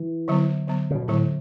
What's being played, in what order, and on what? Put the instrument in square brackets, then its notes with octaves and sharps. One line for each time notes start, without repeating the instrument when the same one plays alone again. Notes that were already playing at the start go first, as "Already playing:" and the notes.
Already playing: [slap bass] E3
[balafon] D3 F#3 B3
D3 F#3 B3
[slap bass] C#3
B2
[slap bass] A2 [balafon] D3 F#3 B3